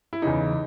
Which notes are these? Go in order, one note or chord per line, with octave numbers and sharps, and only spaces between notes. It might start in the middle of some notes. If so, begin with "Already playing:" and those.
E4
E2 C#3 E3 D#4